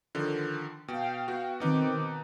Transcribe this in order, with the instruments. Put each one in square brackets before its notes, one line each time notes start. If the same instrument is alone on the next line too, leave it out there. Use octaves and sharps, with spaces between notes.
[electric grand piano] D3 D#3 F3
[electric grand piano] B2 [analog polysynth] F5 G5
[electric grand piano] B3 F#4
[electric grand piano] B2 D#4 B4 [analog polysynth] D#3 C4 D6